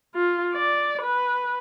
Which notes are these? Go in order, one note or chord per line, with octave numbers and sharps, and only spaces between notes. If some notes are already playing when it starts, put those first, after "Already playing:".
F4
D5
B4